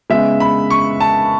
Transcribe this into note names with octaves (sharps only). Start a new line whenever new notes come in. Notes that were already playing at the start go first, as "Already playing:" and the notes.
C#3 G#3 B3 E5
B5
C#6
A5